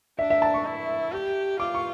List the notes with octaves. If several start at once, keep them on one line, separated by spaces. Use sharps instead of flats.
D4 E5
E5
A5
C#6
E4
G4
F4 D6
C#6